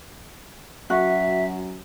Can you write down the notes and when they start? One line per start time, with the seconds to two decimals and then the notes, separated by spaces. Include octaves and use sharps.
0.90 F#2 F#4 E5